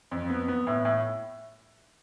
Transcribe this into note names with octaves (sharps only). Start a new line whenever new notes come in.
F2
B3
B3
A2
A2